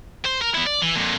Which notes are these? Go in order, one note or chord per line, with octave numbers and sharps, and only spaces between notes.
C5
A#4
B3 E4
D5
E3
F2 A#2